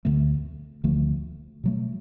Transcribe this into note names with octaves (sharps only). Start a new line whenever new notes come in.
D2 D3 F3 A3
D2 D3 F3 A3
B2 F#3 A3